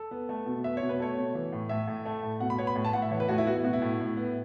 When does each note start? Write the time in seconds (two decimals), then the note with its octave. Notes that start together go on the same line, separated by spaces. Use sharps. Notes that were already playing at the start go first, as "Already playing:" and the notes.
Already playing: A4
0.11 B3
0.29 A3
0.46 B2
0.64 B3 E5
0.77 B2 C#5
0.89 B4
1.00 A3 C#5
1.17 B2
1.35 E3
1.52 A2
1.69 A2 E5
1.87 A2
2.05 A3
2.22 A2
2.40 B2 F#5
2.50 B5
2.59 B3 C#5
2.67 B5
2.75 A2
2.85 A5
2.93 A2 F#5
3.02 E5
3.11 E3 C#5
3.20 B4
3.28 A2 F#4
3.38 E4
3.46 B3 F#4
3.56 E4
3.64 B2 F#4
3.73 E4
3.82 A2
4.00 A2
4.17 B3